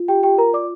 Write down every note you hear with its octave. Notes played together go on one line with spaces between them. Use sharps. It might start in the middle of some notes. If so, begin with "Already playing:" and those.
Already playing: F4
G4 G5
G4 G5
A#4 A#5
D5 D6